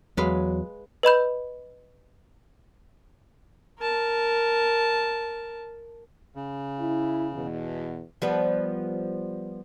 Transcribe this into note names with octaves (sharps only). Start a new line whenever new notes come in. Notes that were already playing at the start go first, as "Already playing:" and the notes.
E2 F#3 G#3 B4 F5
B4 D#5 B5 G6
A#4 A5
C#3
E4
E2 B2
F3 G3 B3